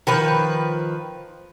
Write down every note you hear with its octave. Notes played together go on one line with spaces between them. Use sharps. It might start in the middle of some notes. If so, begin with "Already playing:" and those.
D#3 F3 B4